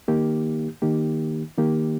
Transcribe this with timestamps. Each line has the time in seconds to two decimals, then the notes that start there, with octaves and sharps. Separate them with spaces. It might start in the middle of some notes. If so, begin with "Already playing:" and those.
0.08 D#3 A#3 D#4 G4
0.82 D#3 A#3 D#4 G4
1.58 D#3 A#3 D#4 G4